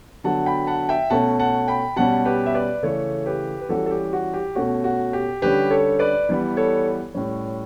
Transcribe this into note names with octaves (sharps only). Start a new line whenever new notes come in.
D3 F#3 B3 F#5 A5
G5 B5
F#5 A5
E5 G5
B2 A3 C#4 F#5 A5
F#5 A5
G5 B5
B2 G3 C#4 F#5 A5
G4 B4
E5
B4 D5
C#3 E3 A3 A4 C#5
G4 B4
B4
E3 G3 C#4 F#4 A4
A4
G4
F#4
G4
B2 A3 C#4 F#4
F#4
G4
D3 G3 C#4 G4 B4
A4 C#5
B4 D5
E3 G3 B3
A4 C#5
A2 G3 C#4